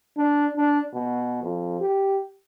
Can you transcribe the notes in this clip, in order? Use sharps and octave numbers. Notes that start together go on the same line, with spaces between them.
D4
D4
B2
F2
G4